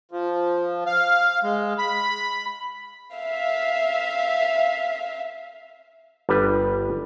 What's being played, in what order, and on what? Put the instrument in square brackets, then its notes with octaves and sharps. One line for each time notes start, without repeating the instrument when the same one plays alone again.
[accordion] F3
F5
G#3
B5
[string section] E5 F5
[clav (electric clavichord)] G1 G3 B4